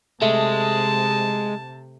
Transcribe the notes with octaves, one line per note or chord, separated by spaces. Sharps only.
C3 G#3 A3 A5